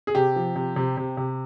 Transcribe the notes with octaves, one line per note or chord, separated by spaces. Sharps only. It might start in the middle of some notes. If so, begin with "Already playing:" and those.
G#4
C3 G4
F3
C3
C3
C3
C3